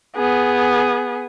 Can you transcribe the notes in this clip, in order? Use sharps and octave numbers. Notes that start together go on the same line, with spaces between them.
B3 G#4